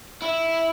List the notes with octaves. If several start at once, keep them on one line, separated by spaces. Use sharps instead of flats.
E4